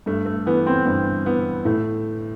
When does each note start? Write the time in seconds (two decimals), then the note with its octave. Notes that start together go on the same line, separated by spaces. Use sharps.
0.06 G2 A3
0.26 A3
0.46 E3 B3
0.66 C4
0.86 G2 C4
1.26 E3 B3
1.65 A2 A3